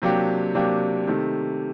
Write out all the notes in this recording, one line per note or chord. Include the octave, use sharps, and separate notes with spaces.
C3 F#3 A#3 D4 G4
C3 F#3 A#3 D4 G4
C3 D#3 A3